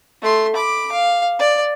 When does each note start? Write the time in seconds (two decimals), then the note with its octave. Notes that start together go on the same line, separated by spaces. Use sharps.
0.22 A3 C6
0.55 B5 D6
0.92 F5
1.39 D5